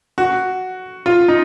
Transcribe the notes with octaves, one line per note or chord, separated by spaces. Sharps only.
F#4
F4
D#4